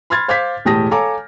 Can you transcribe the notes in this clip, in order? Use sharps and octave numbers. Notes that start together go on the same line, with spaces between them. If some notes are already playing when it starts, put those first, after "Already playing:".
B5 C6 F6 G#6 A6
C5 F5 D6 G6 G#6 B6
E1 A2 G4 A5 D#6 A#6
A4 C#5 F5 G#5 A#5 D6